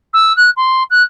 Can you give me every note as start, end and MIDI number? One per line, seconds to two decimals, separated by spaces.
0.13 0.35 88
0.36 0.50 90
0.56 0.83 84
0.90 1.03 90